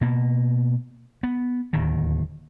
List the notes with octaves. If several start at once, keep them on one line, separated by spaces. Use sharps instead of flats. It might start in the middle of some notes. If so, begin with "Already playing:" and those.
B2 A#3
B3
D1 D#2 D#3